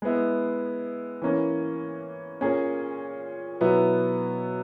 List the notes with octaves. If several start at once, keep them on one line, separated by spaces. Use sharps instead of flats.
G#3 B3 E4
E3 A#3 C#4
A#2 A#3 C#4 G#4
B2 F#3 B3 E4 B4